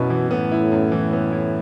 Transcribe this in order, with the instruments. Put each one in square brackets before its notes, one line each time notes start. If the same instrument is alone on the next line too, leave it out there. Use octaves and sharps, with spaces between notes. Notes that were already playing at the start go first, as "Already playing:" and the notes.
Already playing: [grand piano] F#2 B3 E4 [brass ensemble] B2
[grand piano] E3
[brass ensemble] A2 [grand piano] B3
[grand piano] E4
F#2
E3
B3
E4